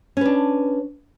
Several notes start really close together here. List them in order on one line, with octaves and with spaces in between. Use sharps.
C#4 B4 D4